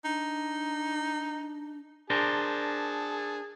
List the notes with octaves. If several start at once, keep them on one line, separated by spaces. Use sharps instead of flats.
D4 D#4
D4 G#4 A#4 C5 A5